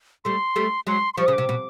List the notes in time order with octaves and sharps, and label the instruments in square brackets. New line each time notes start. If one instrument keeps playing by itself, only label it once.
[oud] G3 A3 [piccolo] C6
[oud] G3 A3
[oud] F#3 G#3 [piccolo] C6
[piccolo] C6
[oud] F3 G3 [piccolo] C#6
[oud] C#3 [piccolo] D#6
[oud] C3 [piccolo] D6
[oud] B2